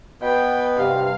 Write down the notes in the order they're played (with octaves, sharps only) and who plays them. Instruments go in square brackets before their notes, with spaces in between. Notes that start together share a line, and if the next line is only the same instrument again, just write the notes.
[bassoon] B2 [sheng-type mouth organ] B3 [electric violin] G5
[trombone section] G2 C3 [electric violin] F5